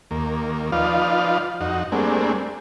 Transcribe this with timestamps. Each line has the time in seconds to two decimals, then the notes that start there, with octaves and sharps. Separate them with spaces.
0.11 D#2 A#3
0.72 F3 D#4 F4 B4 D5 F5
1.61 F2 D#4 F#4
1.92 G3 A3 A#3 C4 D4 G#4